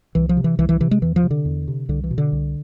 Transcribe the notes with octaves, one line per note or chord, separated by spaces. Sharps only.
C2 E3
F3
C3
E3
C2 E3
E3
C3 E3
G#3
E2 E3
F3
C3
D3
E2
C3
C2 D3
E3
B2
D3
C2